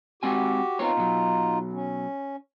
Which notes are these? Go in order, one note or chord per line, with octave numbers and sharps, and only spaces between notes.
G#3 C4 F#4 G4 G#5
B3 C4 D#4 F4 C#5
B2 F#3
C#4